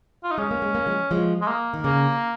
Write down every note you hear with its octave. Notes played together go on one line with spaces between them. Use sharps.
F4
D#4
G#3 C#4
A#3
G#3
A#3
F3 G#3
F3 G#3
G#3
A#3
D#3
C#3 A#3